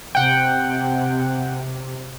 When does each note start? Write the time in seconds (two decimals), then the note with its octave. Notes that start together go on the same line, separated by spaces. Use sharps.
0.15 C3 F#5 G5